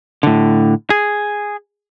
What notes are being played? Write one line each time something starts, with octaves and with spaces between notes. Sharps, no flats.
A2 D3
G#4